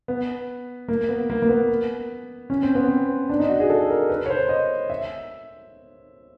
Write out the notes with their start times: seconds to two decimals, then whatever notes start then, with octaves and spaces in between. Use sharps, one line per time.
0.08 B3
0.88 A#3
1.09 B3
1.30 A#3
1.42 A#3
1.49 B3
2.50 C#4
2.63 C4
2.75 B3
2.88 C4
3.29 D4
3.40 D#4
3.49 F#4
3.60 G#4
3.70 A4
3.90 A#4
4.09 B4
4.26 C#5
4.30 C5
4.49 D#5
4.90 E5